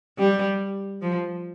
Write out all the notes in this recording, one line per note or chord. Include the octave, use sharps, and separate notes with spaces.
G3
F3